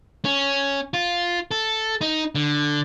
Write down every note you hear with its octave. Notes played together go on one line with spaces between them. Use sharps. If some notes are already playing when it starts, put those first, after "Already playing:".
C#4
F4
A4
D#4
D3